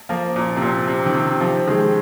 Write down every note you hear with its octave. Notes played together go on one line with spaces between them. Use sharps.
F3 A#3
A#2
C3
A#2
C3
D#3
C3
C3 F3
D#3 G#3